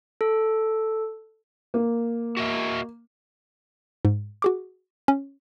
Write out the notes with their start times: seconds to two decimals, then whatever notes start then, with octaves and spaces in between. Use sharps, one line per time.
0.21 A4
1.74 A#3
2.37 F#4 D#5 E5
4.05 G#2
4.42 F#4 G#4 D6
5.08 C#4